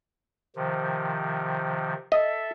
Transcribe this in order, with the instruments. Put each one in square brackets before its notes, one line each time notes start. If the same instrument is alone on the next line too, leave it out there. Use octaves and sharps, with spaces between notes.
[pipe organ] C3 D#3 F3
[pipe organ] A4 E5 [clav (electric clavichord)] D#5